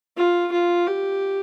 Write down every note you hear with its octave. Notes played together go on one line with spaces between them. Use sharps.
F4
F4
G4